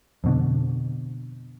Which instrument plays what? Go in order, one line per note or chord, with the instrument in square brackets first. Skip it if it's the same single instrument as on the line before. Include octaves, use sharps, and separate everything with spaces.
[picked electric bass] F2 B2 D3